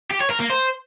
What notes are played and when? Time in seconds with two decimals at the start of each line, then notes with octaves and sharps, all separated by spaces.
0.11 G4
0.20 C#5
0.30 A#4
0.40 A#3
0.50 C5